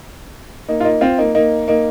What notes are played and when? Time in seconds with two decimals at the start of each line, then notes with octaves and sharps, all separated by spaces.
0.68 A#3 D#4
0.81 F4
0.84 A#3 D#4
1.01 C4 F4
1.18 A#3 D#4
1.35 A#3 D#4
1.68 A#3 D#4